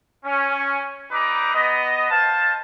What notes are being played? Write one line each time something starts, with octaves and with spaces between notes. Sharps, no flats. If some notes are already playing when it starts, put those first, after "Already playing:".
C#4
G3 D#4 B4 A#5 D6
B3 D#5
C5 F5 A5